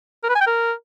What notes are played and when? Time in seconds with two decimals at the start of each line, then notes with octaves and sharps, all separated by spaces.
0.24 A#4
0.29 B4
0.35 G#5
0.41 G5
0.47 A#4